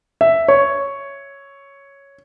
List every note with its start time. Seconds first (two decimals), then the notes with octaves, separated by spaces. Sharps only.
0.21 E5
0.48 C#5